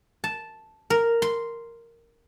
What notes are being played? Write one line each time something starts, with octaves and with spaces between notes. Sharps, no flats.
A5
A#4
C6